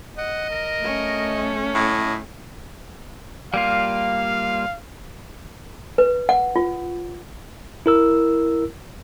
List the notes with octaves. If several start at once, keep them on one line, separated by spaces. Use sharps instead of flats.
D#5 F#5
A#4
A3 C#4
A2 D#5
G3 A#3 F4 F5
B4
F#5
F4
E4 A#4 E6